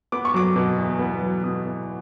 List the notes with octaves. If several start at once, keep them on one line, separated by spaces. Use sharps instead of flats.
B3 D6
C#6
F#3 D6
B2
E2
B3
F#3
B2 D#6
E2